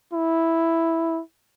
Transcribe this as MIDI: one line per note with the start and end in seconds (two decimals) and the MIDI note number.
0.13 1.21 64